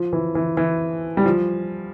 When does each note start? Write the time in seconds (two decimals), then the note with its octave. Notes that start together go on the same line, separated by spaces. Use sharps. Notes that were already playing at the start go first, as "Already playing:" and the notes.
Already playing: F3
0.13 E3
0.35 E3
0.57 E3
1.17 G3
1.26 F3